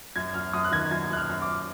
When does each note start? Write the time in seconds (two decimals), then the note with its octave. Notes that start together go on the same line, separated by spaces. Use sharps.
0.16 F#2 G#6
0.34 F#2 F6
0.53 F#2 D#6
0.65 F#6
0.72 D#3 G#6
0.91 F#2 G#6
1.10 F#2 F#6
1.17 F6
1.29 F#2
1.42 D6